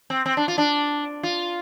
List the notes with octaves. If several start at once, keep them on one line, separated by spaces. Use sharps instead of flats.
C4
C4
D4
F4
D4
F4